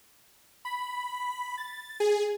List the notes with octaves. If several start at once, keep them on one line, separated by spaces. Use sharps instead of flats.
B5
A6
G#4